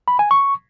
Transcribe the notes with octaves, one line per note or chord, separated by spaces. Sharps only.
B5
G#5
C#6